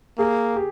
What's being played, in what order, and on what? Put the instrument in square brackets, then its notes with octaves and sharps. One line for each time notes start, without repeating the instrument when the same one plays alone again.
[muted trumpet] A#3 [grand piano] G#4
[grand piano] G4